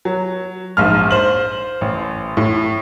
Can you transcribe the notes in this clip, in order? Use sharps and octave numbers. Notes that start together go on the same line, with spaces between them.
F#3
A#1 G#2 F6
C5 F#7
A1
A2